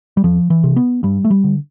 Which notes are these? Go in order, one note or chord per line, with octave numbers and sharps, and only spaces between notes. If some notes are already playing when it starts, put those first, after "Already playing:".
G3
E2 F3
E3
C3
B3
G2 G3
A3
G3
D3